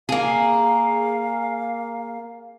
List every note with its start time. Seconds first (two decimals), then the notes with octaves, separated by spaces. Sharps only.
0.09 A#3 G#4 F5